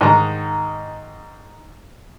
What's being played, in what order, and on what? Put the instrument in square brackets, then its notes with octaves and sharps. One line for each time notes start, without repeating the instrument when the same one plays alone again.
[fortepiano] G#2 D#3 D#4 A#5